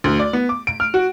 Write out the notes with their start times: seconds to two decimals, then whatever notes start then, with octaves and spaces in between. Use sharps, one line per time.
0.04 D2
0.20 D5
0.33 B3
0.49 D6
0.67 D7
0.80 F6
0.94 F#4